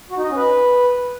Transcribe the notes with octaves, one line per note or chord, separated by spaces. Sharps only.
F#4
D#4
D#5
C#4
B4